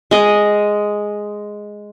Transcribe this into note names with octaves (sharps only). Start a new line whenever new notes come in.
G#3 D#5